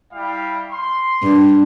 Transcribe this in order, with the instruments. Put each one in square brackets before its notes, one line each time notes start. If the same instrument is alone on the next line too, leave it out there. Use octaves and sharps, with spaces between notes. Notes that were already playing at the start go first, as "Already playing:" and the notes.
[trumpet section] G3 E4 F5
C6
[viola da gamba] G2